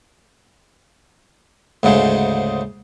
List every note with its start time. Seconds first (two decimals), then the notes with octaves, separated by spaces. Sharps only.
1.83 D2 G#2 C#3 G#3